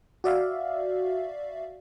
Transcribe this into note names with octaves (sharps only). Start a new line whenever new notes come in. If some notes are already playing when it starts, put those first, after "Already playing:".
F#4 D5 E5 F5